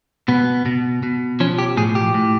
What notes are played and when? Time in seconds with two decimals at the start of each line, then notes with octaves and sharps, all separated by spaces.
0.28 B2 B3
0.66 B2
1.03 B2
1.40 F3 C#4
1.59 G4
1.77 A2 G#4
1.95 G4
2.14 A2